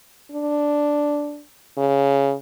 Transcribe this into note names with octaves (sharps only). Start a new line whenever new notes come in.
D4
C#3